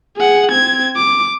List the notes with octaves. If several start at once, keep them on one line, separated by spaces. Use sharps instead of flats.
G#4 F#5
C4 G#6
D6